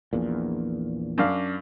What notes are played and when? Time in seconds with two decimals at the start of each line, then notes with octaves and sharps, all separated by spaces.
0.13 A#1 E2 A#2
1.18 F#2 D4 F5